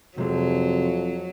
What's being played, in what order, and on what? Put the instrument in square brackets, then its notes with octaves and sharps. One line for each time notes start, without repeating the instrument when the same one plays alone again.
[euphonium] F2 [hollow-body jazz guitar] C3 G#3 [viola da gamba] F#3